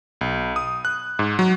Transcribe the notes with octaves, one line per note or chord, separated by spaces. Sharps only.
B1
D#6
F#6
G#2
F#3